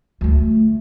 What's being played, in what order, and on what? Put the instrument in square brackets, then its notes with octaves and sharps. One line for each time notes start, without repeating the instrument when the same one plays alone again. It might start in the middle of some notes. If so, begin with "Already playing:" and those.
[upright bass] D2 A3